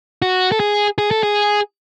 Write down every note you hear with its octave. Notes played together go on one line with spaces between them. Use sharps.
F#4
A4
G#4
G#4
A4
G#4